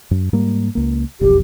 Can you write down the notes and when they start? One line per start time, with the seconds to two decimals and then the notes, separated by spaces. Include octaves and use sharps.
0.11 F#2
0.33 G#2 G3 A#3
0.75 C#2 A#3
1.21 E1 B1 F2 G4